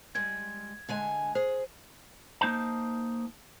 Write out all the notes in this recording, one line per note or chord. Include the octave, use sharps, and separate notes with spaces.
G3 G#3 G#6
D3 G#3 G#5
G#4 C5
A#3 D#4 C5 A5